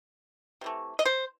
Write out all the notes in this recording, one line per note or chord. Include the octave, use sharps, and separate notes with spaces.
C3 E3 A3
D#5
C5